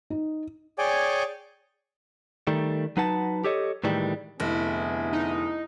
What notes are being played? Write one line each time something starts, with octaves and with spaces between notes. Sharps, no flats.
D#4
G#4 C#5 D5 G5 G#5 D6
D#3 G3 A3
F#3 D#4 B4 F#5 A5
G4 A4 C#5 D#5
A2 D#3 E3 G3 G#3
F1 D3 B3 E4 G#4
D#4